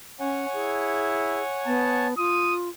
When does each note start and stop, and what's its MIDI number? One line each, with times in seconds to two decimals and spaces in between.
0.20 0.46 61
0.20 2.07 73
0.20 2.07 78
0.20 2.07 80
0.54 1.43 64
0.54 1.42 68
1.66 2.14 59
1.66 2.10 81
2.18 2.69 65
2.18 2.54 87